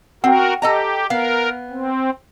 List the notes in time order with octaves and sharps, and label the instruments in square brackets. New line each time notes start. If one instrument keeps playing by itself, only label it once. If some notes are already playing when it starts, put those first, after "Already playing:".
[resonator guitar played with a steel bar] C4 [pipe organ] F#4 A#4 [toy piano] F#5 G5
[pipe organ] G4 [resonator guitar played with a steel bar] A4 D#5 A#5
[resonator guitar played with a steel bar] B3 F5 [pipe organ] A#4
[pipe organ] C4